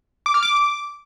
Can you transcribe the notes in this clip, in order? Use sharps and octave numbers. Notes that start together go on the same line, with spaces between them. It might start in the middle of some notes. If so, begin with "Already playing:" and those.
D6
F6
D6